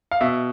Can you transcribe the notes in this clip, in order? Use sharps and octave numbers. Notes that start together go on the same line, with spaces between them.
F5
B2 E5